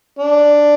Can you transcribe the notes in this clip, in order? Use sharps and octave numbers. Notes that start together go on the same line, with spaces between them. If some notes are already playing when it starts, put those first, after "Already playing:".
D4